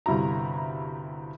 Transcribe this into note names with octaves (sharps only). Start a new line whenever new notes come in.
G1 C3 G3 E4 F#4 A#5